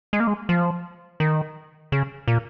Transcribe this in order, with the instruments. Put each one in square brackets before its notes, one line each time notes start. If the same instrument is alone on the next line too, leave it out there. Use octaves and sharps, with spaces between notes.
[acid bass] G#3
A#3
G#3
F3
D#3
C#3
A#2